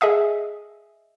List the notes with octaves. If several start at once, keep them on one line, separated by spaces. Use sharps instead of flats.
G#4 D#5 E5 D#6